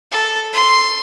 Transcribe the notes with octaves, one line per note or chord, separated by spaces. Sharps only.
A4
C6